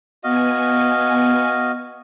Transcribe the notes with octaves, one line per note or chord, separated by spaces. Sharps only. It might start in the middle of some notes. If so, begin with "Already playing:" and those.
B3 F#4 D#5 F5 G#5